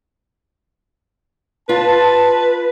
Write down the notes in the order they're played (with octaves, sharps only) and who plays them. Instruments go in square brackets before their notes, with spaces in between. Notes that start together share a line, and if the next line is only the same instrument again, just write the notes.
[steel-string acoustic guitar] F4 [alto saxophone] B4 [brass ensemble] A5